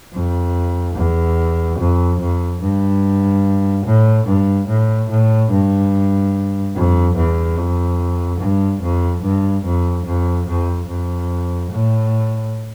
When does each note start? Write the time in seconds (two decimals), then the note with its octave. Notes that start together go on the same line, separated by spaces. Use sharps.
0.13 F2
0.96 E2
1.79 F2
2.20 F2
2.62 G2
3.85 A2
4.26 G2
4.68 A2
5.09 A2
5.51 G2
6.75 F2
7.16 E2
7.57 F2
8.40 G2
8.81 F2
9.22 G2
9.64 F2
10.06 F2
10.47 F2
10.88 F2
11.71 A2